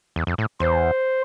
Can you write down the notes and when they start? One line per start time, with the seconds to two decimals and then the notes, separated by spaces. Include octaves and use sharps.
0.16 E2
0.27 F2
0.38 A2
0.60 E2 C5